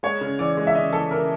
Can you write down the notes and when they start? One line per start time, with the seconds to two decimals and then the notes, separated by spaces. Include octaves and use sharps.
0.03 G#3 C#5
0.21 C#3
0.39 E3 D5
0.57 G#3
0.67 E5
0.75 C#3 D#5
0.93 E3 A4
1.11 C#3 A#4